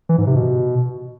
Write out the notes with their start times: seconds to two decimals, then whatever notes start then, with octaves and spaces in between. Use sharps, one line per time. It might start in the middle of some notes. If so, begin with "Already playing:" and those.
0.09 E3
0.18 G#2
0.27 C3
0.36 B2